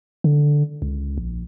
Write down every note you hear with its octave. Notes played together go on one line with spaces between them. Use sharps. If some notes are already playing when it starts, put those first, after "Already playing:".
D3
C#2
A#1